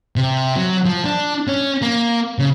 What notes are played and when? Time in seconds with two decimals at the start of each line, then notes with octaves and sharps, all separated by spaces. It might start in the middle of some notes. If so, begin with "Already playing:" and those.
0.16 C3
0.56 F#3
0.85 F3
1.05 D4
1.48 C#4
1.82 A#3
2.39 C#3